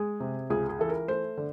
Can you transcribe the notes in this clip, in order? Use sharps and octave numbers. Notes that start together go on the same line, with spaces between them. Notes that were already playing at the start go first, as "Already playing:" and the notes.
Already playing: G#3 G#4
C3
C#2 G#4
G#4
E3 A4
A#4
A3 C5
D3